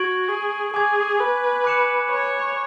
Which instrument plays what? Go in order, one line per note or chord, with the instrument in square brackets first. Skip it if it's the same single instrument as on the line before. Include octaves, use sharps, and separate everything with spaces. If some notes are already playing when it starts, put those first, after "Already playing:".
Already playing: [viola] F#4 [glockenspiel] C#6 G#6 D7 F#7
[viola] G#4
[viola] G#4 [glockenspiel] G#5 D6 G#6
[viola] B4
[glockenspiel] B5 D6 F#6 C#7 E7
[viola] C#5